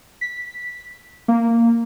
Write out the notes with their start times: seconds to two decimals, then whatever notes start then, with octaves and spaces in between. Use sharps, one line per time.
0.21 B6
1.28 A#3